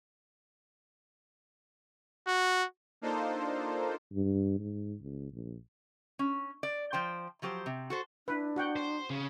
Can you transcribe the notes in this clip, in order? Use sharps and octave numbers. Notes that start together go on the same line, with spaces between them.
F#4
A#3 D4 D#4 F4 A4 C5
G2
G#2
C#2
A#1
C#4
D5
F3 C5 G5
F3 F#3 G4 C5
C3
F#4 A4 C5
D4 E4 B4
F#4 F#5 G5
C5
C#3